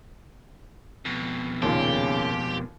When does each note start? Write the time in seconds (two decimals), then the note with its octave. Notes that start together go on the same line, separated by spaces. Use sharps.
1.05 F2 B2
1.62 D#2 A#2 C#3 G4